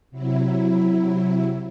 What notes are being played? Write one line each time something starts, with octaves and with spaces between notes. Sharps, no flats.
C3 F#3 E4